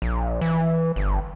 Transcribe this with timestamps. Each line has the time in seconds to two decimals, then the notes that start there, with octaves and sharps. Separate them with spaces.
0.02 A#1
0.41 E3
0.96 G1